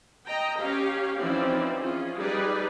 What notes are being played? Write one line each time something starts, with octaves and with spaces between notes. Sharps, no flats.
D#5 G5 A#5
C#4 G4 C#5 F5
E3 F3 C4 C#4 D#4 D5
C#4 F4 G#4
G3 D#4 G#4 B4 D5